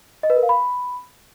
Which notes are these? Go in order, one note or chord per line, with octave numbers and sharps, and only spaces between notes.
D#5
B4
A#4
F5
B5